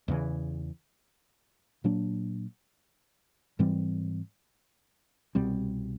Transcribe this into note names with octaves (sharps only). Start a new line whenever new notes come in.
E2 C#3 E3
A#2 F#3 A#3 D4
G#2 E3 G3 C4
C2 B2 G3 C4